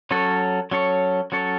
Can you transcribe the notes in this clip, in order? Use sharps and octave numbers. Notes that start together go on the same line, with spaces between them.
F#3 C#4 A4 C#5
F#3 C#4 A4 C#5
F#3 C#4 A4 C#5